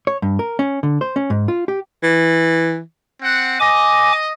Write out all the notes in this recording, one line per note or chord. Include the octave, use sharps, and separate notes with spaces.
C#5
G2
A#4
C#4
D3
C5
C#4
G#2
F4
G4
E3
C4 F#5
D#5 G#5 D6